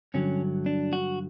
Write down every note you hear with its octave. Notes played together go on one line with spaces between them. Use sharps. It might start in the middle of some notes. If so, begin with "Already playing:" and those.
G2 D3 F#3 C#4
D4
F#4